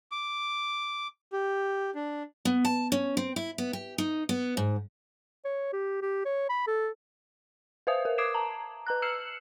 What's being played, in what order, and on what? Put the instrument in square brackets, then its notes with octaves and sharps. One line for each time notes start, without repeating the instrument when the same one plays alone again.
[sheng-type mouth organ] D6
G4
D4
[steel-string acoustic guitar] B3
A5
C#4
C4
E4
B3
G4
D#4
B3
G#2
[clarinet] C#5
G4
G4
C#5
B5
A4
[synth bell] B4 C5 E5 F5 D#6 F7
A#4
D6 D#6 G#6 C7 D7 E7
A5 A#5
B4 A#5 F#6
E6 F6 C7 C#7 E7 F#7